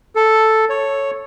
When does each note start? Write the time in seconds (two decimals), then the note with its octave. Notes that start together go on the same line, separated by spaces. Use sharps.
0.15 A4
0.69 C#5